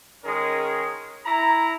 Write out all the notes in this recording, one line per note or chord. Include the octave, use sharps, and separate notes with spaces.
D#3 G#3 C#4 G#4 A#4
E4 A#5